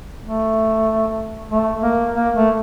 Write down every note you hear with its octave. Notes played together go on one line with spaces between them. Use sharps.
A3
A3
A#3
A#3
A3